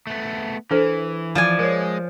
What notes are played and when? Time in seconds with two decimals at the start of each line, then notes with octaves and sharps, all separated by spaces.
0.07 A3 B3
0.71 E3 D4 A4 C5
1.35 F3 D5 G#5
1.59 G#3 A#4 C#5